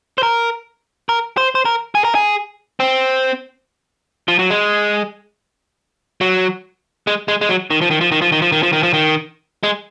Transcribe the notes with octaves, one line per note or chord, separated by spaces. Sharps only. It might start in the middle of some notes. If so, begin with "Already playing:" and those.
C5
A#4
A#4
C5
C5
A#4
G#4
A#4
G#4
C4
F3
F#3
G#3
F#3
G#3
G#3
G#3
F#3
D#3
F3
D#3
F3
D#3
F3
D#3
F3
D#3
F3
D#3
F3
D#3
G#3